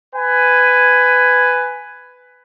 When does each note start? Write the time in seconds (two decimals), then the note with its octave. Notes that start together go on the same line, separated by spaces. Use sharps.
0.15 B4 G#5